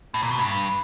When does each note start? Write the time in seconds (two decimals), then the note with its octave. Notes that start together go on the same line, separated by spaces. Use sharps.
0.14 A2
0.23 A#2
0.31 B2
0.39 G2